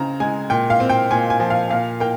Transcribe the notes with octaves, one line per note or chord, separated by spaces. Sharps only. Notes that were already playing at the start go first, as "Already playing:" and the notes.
Already playing: C#3 C4 A#5
G#3 G#5
A#2 G5
F5
C4
G5
A#2 G#5
G#5
F3
F5
A#2 F5
A#3 G5